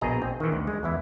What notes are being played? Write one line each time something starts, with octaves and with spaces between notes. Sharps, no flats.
A#1 B2 G#4 D#5 A#5
C4
D#3 E3
D2
G#3
E2 E3 E4